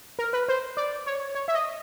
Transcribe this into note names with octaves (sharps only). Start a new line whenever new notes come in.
A#4
B4
C5
D5
C#5
C#5
E5
D#5